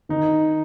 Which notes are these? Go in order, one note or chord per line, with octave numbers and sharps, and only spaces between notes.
D#3 D#4